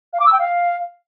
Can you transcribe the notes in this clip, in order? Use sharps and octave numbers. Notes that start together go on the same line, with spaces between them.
F5
D6
E6
G5
F5